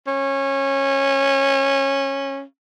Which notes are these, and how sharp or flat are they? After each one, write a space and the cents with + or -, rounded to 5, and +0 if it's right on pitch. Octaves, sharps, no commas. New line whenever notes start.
C#4 -20